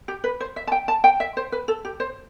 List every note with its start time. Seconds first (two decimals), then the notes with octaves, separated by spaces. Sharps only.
0.08 G4
0.24 B4
0.40 C5
0.56 E5
0.67 A5
0.72 G5
0.88 A5
1.04 G5
1.20 E5
1.37 C5
1.52 B4
1.68 A4
1.85 G4
2.00 C5